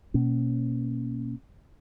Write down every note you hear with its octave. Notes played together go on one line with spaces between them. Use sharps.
B2 A#3 C#4